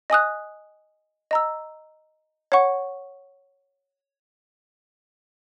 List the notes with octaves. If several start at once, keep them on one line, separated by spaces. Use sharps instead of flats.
D#5 G#5 D#6 F#6
D#5 A#5 E6
C#5 F#5 C#6